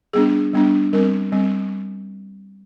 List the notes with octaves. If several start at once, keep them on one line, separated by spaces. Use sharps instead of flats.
G3 B3 D4 G#4
G3 B3 D4
G3 C4 A#4
G3 C4